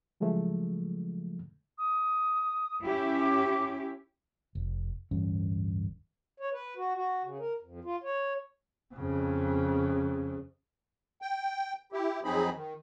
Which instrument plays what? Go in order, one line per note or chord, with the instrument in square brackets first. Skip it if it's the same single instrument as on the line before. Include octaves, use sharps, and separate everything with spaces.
[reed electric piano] C#3 F3 F#3 G#3 A3
[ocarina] D#6
[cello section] C#4 E4 G4
[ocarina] D6
[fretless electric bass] F1
D1 G2 E3 C#4
[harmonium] C#5
B4
F#4
F#4
C#3
A#4
F2
F4
C#5
[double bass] F2 C#3
[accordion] G5
E4 G4
F2 F#3 C4 D#4 G#4 B5
D#3